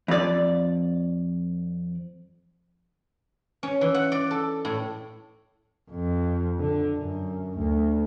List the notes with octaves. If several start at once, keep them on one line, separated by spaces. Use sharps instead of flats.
F2 D5
C#4
E3
F#5
D5
A4
A2
F2
D3
F#2
D2